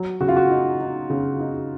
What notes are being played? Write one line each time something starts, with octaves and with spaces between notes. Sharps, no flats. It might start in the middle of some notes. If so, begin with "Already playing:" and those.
Already playing: F#3
C#3 F#4
F4
F#4
D#4
D#4
C#3
D#4